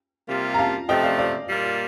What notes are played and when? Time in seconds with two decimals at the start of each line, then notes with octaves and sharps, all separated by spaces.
0.29 C3 G3 A#3 F4
0.54 A#5
0.58 F5 A5
0.89 C3 F3 A3 D#5 G5
1.03 D5 F5
1.19 D5 F5
1.49 A#2 G3 A#3 F4